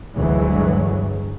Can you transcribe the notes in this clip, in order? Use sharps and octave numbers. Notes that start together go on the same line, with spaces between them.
D2 G2 E3 F#3 G#3